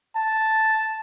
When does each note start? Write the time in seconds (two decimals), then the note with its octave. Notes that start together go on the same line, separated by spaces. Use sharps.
0.16 A5